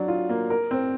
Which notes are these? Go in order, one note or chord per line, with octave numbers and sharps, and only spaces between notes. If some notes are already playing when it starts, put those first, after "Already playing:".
Already playing: F#3 D4
F4
A#3
A#4
C4